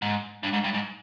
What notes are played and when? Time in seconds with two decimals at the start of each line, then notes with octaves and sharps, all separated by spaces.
0.02 G#2
0.43 G2
0.53 G#2
0.64 G2
0.73 G#2